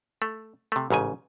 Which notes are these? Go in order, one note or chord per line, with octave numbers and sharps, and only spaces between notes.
A3
C3 A3
A1 G#2 C#3 G#5